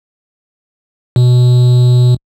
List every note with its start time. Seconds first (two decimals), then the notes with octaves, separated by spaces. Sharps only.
1.16 B2